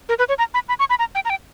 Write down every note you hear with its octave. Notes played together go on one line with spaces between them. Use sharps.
A#4
B4
C#5
A#5
B5
B5
C#6
B5
A#5
G5
A#5
G5